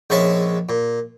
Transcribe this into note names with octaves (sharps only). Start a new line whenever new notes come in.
A#1 G#3 C#4 E5 A5
A#2